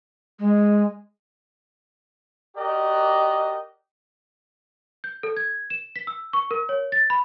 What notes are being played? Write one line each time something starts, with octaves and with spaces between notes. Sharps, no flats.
G#3
F#4 G4 A#4 D5 D#5
G6
A4
G#6
E7
B6
E6
C#6
A#4
C#5
A6
B5